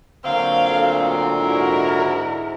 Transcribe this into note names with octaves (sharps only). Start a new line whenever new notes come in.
A#2 D3 F#3 C4 F5
D2
G#2 E4 F#4 A#4